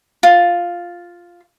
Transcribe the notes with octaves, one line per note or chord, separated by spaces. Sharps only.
F4